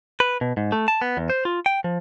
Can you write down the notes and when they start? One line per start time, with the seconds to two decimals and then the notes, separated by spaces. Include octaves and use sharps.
0.20 B4
0.41 B2
0.57 G#2
0.72 A3
0.88 A5
1.02 B3
1.17 E2
1.30 C5
1.45 F4
1.66 G5
1.84 F3